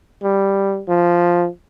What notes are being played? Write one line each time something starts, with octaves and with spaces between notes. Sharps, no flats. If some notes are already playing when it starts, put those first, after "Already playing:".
G3
F3